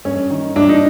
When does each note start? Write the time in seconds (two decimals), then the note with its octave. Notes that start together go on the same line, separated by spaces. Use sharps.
0.05 G2 C#4
0.30 D#3
0.56 G2 D4
0.69 D#4